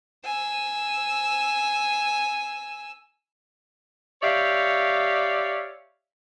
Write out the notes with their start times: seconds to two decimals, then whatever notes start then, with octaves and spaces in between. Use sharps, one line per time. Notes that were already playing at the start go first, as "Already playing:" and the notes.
0.25 G#5 E6
4.22 G4 C#5 D5 E5 F5